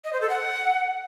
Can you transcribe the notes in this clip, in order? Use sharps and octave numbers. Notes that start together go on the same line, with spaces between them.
D#5
C5
A4
F#5